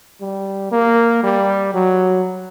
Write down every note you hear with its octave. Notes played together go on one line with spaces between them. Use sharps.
G3
A#3
G3
F#3